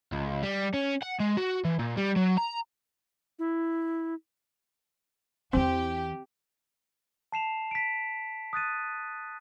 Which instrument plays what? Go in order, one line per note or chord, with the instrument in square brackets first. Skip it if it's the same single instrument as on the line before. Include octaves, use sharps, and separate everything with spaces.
[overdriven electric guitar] C#2
G3
C#4
F#5
G#3
F#4
E3
A#2
G3
F#3
A#5
[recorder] E4
[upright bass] E2 E3 [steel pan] C4 [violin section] G4
[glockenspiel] A5 C7 E7 F7
B6 D7
D#6 F#6 A6 D#7